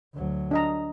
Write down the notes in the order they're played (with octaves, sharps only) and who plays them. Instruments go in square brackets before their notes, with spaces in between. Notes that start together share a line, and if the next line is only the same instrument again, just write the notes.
[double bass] D2 F#3
[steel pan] D4 D#5 A#5